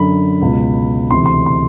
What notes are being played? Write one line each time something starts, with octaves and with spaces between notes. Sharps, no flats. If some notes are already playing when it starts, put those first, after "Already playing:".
Already playing: F#2 D3 B5
C#2 B2
D2 C3 E3 C6
C6
C6